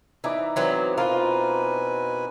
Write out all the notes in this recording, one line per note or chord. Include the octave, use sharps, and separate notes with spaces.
E3 D#4 E4 D5
E3 F#3 B3 C4
B2 F4 A#4 B4 G#5